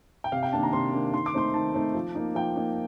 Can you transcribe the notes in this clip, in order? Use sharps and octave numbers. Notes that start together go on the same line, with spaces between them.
G5
C3 F5
G5
D#3 A#3 D4 A5
A#5
C3 C6
D#3 A#3 D4
D#3 C6
D6
A3 C4 D#4 C6
D#3 A5
A3 C4 D#4
F3
A#3 D#4
F3 G5
A#3 D#4